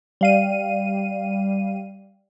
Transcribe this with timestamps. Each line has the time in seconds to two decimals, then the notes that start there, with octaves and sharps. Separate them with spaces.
0.21 G3 F5 D#7